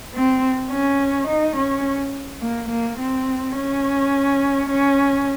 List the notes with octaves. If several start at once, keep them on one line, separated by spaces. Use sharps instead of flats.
C4
C#4
D#4
C#4
A#3
A#3
C4
C#4
C#4